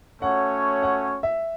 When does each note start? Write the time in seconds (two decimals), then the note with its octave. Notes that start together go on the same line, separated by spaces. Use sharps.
0.22 A3 C#4 F#4 C#5 F#5
0.83 F#5
1.23 E5